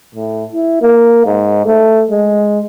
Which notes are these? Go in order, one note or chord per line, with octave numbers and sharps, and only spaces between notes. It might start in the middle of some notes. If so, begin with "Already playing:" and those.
A2
E4
A#3
G#2
A3
G#3